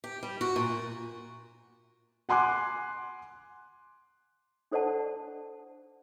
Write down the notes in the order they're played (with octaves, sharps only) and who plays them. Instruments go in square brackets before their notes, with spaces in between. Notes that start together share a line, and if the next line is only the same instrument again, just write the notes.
[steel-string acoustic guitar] G4
G3
F#4
A#2
[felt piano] F#5 G#5 C6 D6 F#6
[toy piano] D4 A4 C5 D5 F#5 A5